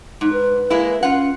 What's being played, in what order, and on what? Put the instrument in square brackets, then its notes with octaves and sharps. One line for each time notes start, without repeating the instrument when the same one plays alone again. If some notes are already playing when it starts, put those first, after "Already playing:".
[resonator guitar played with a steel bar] G#2 [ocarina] D#4
[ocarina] B4
[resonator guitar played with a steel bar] G#3 A#3 E4
[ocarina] C#4 [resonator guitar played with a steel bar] F4 F#5